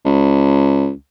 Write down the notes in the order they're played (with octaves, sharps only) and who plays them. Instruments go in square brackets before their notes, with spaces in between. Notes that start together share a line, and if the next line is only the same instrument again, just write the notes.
[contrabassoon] C#2